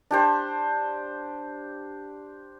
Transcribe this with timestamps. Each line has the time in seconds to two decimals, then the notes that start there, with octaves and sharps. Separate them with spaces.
0.11 D4 G4 C5